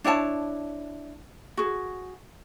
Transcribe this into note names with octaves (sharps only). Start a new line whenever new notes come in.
D4 E4 C#5 A5
F#4 G#4